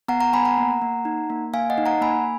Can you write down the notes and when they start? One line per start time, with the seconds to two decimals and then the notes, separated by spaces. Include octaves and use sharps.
0.08 B3 F#5 A#5
0.20 F#5 A#5
0.33 B3 G#5 B5
0.45 F#5 A#5
0.58 A#3
0.82 A#3
1.05 D#4
1.30 A#3
1.53 A#3 F5 G#5
1.70 D#5 F#5
1.78 D#4
1.86 F#5 A#5
2.01 A#3 G#5 B5